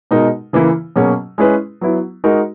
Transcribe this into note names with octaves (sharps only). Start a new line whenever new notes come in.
B2 G#3 D#4 A#4
C#3 E3 A#3 E4
B2 F#3 A#3 C#4 G#4
G#3 C#4 E4 G#4 B4
F#3 B3 E4
G#3 D#4 F#4 A#4